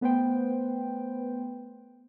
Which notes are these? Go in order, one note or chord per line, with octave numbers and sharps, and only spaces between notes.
A3 B3 B4 C5 G5